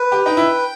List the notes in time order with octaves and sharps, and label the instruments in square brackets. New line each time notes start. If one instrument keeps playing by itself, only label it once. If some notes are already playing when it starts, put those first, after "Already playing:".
Already playing: [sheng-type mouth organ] B4
[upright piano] G4
[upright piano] D#4 [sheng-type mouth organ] G5
[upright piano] E4